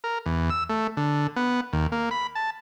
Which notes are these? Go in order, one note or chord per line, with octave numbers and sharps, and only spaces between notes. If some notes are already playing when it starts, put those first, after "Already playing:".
A#4
E2
E6
A3
D3
B3
D#2
A#3
B5
A5